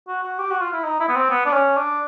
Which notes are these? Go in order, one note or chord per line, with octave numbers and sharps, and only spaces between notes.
F#4
F#4
G4
F#4
F4
E4
D#4
E4
B3
C4
B3
D4
C#4
D4